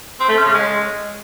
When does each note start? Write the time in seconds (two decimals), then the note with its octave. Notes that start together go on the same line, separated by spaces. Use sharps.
0.20 C4
0.28 A3
0.37 C#4
0.45 C#3
0.54 G#3